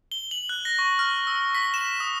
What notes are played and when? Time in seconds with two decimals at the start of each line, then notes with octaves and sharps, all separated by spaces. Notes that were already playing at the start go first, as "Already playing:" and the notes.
0.12 G7
0.31 F#7
0.49 F#6
0.65 A#6
0.79 C#6
0.99 F6
1.27 E6
1.55 B6
1.74 E7
2.00 D#6